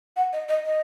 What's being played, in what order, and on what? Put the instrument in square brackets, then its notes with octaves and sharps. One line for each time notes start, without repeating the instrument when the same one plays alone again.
[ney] F#5
D#5
D#5
D#5